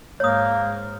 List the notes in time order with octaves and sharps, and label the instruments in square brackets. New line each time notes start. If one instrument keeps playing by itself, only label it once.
[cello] G#2 [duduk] A#3 [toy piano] C#5 D#6